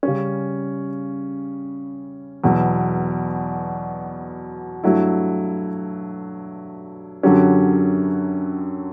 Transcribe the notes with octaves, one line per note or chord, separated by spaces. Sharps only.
C#3 G3 C#4
E2 B2 F#3
G2 F#3 A3 E4
F#2 D3 F#3 C#4 G4